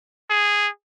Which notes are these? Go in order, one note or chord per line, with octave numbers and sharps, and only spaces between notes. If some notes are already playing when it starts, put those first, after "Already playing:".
G#4